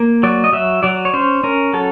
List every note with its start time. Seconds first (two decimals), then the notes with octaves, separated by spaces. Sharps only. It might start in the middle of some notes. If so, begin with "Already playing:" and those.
Already playing: A#3
0.23 F#3 D5
0.44 D#5
0.52 F#3 E5
0.83 F#3 D5
1.05 C#5
1.13 C#4 C5
1.44 C#4 A#4
1.74 F#3 A4